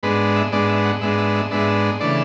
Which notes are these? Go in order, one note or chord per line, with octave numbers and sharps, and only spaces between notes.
G#2 G#3 B3 D4 B4
E5
G#2 G#3 B3 D4 D5
E5
F#5
G#2 G#3 B3 D4 E5
E5
E5
G#2 G#3 B3 D4 E5
C#3 E3 A3 D4 D5